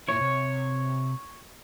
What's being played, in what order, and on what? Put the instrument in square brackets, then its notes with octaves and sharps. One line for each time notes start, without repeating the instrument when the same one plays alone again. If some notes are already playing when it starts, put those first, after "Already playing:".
[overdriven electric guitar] A#2 E4 [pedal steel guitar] C#5
[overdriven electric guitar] C3